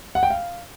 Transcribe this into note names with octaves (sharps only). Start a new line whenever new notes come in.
F#5
G5
F5